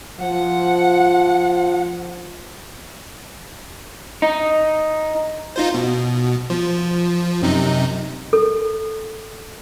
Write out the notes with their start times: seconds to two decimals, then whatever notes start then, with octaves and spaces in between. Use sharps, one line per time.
0.20 F3 F#5
4.22 D#4
5.56 D#4 F4 C5
5.74 B2
6.50 F3
7.42 F#2 C3 D#4
8.33 A4